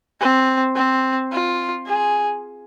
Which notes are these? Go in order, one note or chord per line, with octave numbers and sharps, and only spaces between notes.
C4
C4
F4
G#4